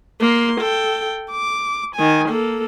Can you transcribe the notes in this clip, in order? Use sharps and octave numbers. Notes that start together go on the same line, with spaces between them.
A#3 C6
A4 G5
D6
D#3 G#5
A#3 A4